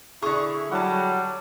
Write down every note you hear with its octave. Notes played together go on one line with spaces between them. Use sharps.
D3 E4 G#4 C#6
F#3 G3 F#5 A5